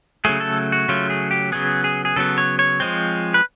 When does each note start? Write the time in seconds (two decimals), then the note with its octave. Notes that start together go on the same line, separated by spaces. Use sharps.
0.25 C#3 F#3 A3 G#4
0.40 A4
0.72 F#4
0.88 C#3 F#3 A3 F4
1.10 G#4
1.31 G4
1.52 C#3 F#3 B3 G#4
1.84 G#4
2.05 G#4
2.16 C#3 F#3 B3 A4
2.38 C#5
2.59 C#5
2.80 F3 G#3 C4
3.34 B4